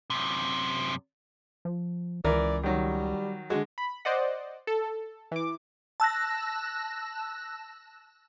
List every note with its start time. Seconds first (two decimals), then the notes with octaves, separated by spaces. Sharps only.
0.10 F#2 C3
1.65 F3
2.25 C#2 E3 A#4 D5
2.63 D#3 F#3 G3
3.50 D3 G#3 F#4
3.78 B5
4.05 C5 D5 D#5 F#5
4.67 A4
5.32 E3 D6
6.00 A5 E6 F#6 A#6